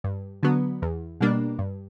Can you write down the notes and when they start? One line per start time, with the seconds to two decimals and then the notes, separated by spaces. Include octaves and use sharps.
0.04 G2
0.43 D3 F#3 B3
0.82 E2
1.21 B2 G3 A#3 D4
1.59 G2